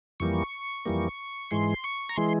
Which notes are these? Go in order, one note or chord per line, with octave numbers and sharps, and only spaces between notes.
F2 E3 G3 A#3 C#6
F2 E3 G3 A#3
G#2 E3 G#3 C6
C#6
A#5
E3 G#3 C6